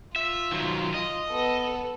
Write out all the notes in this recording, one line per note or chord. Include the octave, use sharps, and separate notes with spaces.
F4 E5
D#3 F#3
D#5
B3 A4